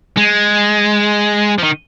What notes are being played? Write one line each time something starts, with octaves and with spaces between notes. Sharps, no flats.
G#3
F3
D#3